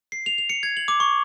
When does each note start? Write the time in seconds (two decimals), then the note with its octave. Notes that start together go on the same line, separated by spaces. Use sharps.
0.12 C7
0.26 F7
0.38 F7
0.50 C#7
0.63 G#6
0.77 F#7
0.88 D6
1.00 C#6